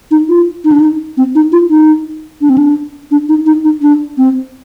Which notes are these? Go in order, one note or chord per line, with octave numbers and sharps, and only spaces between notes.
D#4
F4
D#4
D4
D#4
C4
D#4
F4
D#4
D4
C4
D4
D4
D#4
D#4
D#4
D4
C4